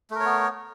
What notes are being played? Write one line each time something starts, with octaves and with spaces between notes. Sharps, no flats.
A3 B3 A#4 C#5